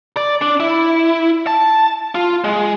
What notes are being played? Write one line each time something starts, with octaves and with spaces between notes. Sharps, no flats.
D5
D4
E4
A5
F4
G#3